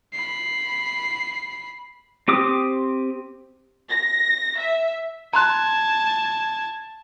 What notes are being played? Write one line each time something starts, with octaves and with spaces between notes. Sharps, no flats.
B5 C7
C4 G4 D6 D#6
A#6
E5
A5 A#5 C6 F#6 G#6